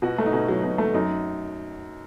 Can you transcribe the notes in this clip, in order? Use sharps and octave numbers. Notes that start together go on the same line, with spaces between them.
B2 F#4
A3
D#4
B2
F#3
B2
A3
F#2 D#4